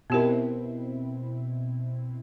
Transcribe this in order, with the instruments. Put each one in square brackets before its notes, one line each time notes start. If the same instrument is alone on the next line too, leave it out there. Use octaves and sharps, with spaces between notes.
[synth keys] B2 C4 E4 [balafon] B3 G4 A#4